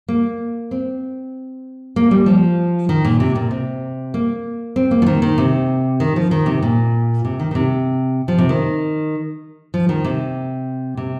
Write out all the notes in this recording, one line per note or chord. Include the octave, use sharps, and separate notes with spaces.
A#3
C4
A#3
G3
F3
D#3
A#2
C3
A#2
C3
A#3
C4
A#3
F3
D#3
D#3
C3
D#3
F3
D#3
C3
A#2
C3
D#3
D#3
C3
F3
C3
D#3
F3
D#3
C3
C3